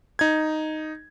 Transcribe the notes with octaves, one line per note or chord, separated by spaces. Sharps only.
D#4 G#6